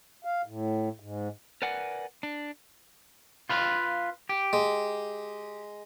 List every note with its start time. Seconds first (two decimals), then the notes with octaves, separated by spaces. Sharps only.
0.25 F5
0.46 A2
1.00 G#2
1.62 A#4 B4 D5 F#5 G#5
2.23 D4
3.49 F4 B4 F5
4.29 G4
4.53 G#3